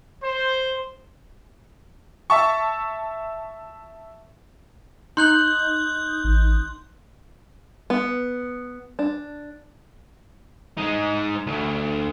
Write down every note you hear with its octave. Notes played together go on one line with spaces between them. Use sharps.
C5
E5 A5 C#6
D#4 C6 F#6 G6 F#7
A1
B3
D4
G#3 D#4
D2